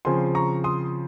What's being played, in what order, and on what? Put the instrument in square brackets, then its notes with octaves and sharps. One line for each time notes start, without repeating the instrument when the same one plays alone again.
[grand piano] C#3 F3 C4 G#5 C6
A#5 C#6
C6 D#6